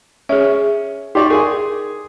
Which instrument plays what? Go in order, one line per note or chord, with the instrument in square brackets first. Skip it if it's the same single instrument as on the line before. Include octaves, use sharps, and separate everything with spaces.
[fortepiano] C#4 [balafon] G#4 E5
[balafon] D#4 [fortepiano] G4 D5 C#6
[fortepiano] G#4 G#5 C6 [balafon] A#4